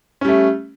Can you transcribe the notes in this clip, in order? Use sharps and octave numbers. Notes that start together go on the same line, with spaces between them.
G3 A3 C#4